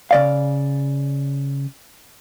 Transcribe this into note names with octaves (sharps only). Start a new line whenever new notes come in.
C#3 D5 F5